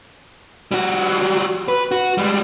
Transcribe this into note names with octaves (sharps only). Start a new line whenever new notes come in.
G3 F#4
B4
F#4
G3 G#3